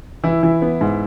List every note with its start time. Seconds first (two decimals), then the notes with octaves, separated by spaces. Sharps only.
0.24 E3 E4
0.43 E3
0.62 B3
0.81 G#2